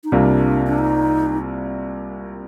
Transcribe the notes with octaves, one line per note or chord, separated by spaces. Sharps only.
D#4
C2 C3 G3 A#3 D4 F4
D4
D#4